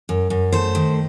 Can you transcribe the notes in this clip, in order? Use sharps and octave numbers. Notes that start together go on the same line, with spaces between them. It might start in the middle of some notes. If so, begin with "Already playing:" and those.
F#2
F#2
A3 C5
D#3